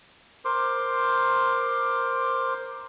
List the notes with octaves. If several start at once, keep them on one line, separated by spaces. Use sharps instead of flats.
A#4 C5 C6 D6